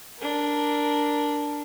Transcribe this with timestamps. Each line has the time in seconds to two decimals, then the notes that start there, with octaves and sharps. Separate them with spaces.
0.19 D4 A#4